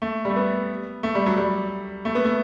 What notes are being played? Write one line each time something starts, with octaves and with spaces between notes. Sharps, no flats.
A3
G3 A3
B3
A3
G3
F#3
G3
A3
B3
A3